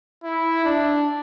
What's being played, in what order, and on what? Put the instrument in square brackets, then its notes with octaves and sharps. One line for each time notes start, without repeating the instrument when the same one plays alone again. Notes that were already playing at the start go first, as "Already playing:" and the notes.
[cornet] E4
D4